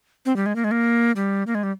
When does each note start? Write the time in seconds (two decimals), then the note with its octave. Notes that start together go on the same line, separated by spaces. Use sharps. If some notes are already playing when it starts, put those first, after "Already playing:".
0.26 C4
0.36 G3
0.46 G#3
0.56 A#3
0.64 G#3
0.71 A#3
1.16 G3
1.47 A#3
1.55 G#3
1.63 G3